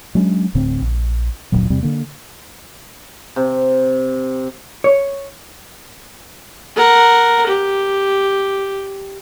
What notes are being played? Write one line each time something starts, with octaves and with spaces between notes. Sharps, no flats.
F#3 G#3 C#4 D4
D1 A2 D3 C4
A#1
F1 D2 A#2 F#3
E2 C3 G3 C4
D3 A#3
C3
C#5
A#4 F#5
G4